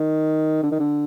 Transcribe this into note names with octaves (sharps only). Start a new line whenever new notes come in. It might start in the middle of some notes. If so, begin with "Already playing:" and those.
Already playing: D#3
D3
D#3
D3